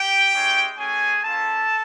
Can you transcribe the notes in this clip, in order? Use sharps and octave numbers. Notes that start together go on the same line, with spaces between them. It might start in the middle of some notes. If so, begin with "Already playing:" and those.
Already playing: G4 G5
G#3 C#4 E4 G4
A3 C#4 F#4 G#4 G#5
A#3 C#4 F4 A4 A5